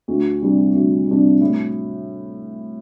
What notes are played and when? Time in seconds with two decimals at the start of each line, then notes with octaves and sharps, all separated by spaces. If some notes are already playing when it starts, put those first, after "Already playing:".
0.08 D2
0.41 C3 G3 D4
0.75 D2
1.07 C3 G3 D4
1.41 A2